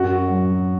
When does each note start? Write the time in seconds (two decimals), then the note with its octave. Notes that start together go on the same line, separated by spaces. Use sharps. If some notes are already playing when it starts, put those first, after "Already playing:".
Already playing: F#2 F#4
0.28 F#3